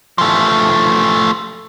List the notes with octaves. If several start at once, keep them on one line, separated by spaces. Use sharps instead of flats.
F3 A3